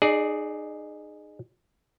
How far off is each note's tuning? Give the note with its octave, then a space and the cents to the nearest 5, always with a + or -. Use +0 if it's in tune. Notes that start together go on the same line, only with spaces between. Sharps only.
D#4 -30 G#4 +5 D5 +0